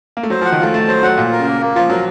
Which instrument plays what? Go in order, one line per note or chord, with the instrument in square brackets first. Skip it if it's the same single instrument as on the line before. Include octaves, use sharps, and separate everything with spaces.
[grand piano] A#3
A3
[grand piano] F#3 [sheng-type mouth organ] C5
[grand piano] F3 [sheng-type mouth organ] F#5
[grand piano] D#3
[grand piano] A3 [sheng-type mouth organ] F4
[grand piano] A3 [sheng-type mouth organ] A5
[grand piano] F#3 [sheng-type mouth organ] C5
[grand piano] F#3 [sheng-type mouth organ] F#5
[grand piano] A#2 [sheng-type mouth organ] F4
[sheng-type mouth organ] A#4
[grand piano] C#3
[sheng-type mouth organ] A#3
A#3
[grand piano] F3 [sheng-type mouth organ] F4
[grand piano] F#3 [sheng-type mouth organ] A#4